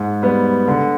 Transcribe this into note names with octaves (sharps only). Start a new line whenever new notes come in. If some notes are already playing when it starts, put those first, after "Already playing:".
Already playing: G#2
G3 B3
D3